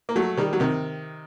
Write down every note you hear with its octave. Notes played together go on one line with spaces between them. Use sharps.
A#3
F#3 A3
D#3 G3
F#3
C3 D#3